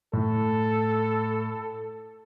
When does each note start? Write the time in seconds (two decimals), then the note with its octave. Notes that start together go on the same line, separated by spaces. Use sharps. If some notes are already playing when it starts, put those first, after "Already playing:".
0.13 A2 A4